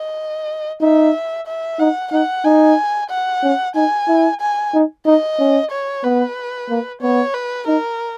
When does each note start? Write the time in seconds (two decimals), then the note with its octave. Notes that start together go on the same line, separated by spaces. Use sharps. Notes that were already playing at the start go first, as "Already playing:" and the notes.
Already playing: D#5
0.81 D#4 E5
1.47 E5
1.79 D#4 F#5
2.12 D#4 F#5
2.45 D#4 G#5
3.10 F#5
3.43 C#4
3.75 D#4 G#5
4.08 E4
4.41 G#5
4.74 D#4
5.06 D#4 D#5
5.39 C#4
5.71 C#5
6.04 B3 B4
6.69 A#3
7.02 B3 C#5
7.34 B4
7.67 D#4 A#4